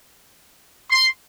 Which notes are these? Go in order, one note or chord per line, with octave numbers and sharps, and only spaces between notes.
C6